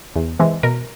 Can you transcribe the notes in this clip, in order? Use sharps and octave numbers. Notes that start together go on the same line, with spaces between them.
E2
C3 E3 G#3
B2 A#4